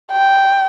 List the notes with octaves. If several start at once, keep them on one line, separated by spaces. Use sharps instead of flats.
G5